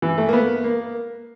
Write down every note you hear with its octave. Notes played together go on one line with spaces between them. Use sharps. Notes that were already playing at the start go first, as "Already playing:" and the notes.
E3
A3
A#3
B3
A#3